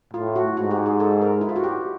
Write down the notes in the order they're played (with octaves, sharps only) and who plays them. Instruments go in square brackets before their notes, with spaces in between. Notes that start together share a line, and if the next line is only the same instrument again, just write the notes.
[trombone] A2 [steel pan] F4
[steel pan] F#4
[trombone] G#2 [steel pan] F#4
[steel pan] G4
G#4
A4
A#4
E4
F4
F#4
G4